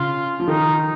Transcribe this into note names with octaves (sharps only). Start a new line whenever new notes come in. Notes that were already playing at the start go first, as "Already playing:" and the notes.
Already playing: C#3 F4
F3
D#3 D#4